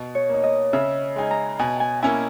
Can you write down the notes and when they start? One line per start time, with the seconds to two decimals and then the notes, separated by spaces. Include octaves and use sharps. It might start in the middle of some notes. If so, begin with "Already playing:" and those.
Already playing: B2
0.15 C#5
0.29 A#3 D#4
0.44 D#5
0.73 C#3 E5
1.16 G#3 D#4 G#5
1.31 A#5
1.59 B2 G#5
1.80 G#5
2.03 A#3 C#4 E4 G#5